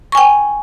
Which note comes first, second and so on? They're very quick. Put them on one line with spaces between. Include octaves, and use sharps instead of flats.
C#6 G#5 G5